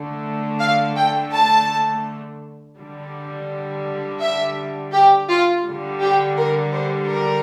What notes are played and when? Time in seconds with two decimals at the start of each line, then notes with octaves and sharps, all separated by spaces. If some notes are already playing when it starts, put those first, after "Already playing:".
Already playing: D3 A3
0.59 F5
0.96 G5
1.32 A5
2.77 D3 G3
4.20 E5
4.92 G4
5.29 F4
5.64 D3 G3
6.01 G4
6.37 A#4
6.74 C5
7.09 A#4